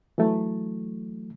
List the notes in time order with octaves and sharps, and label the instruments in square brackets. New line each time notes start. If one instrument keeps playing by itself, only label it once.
[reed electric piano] E3 F#3 A3